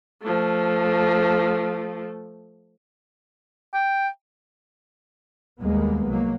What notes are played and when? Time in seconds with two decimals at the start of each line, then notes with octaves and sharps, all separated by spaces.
0.22 F3 A3
3.74 G5
5.60 D#2 G3 G#3 A#3 B3
6.06 C2 F#3 A#3